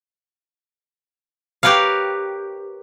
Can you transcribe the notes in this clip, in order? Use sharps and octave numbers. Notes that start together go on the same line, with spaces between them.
G4 A#4 B4 C#5 F5